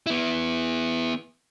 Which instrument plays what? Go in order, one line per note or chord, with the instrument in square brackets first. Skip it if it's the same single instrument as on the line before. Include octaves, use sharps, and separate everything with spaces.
[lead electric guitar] B3 E4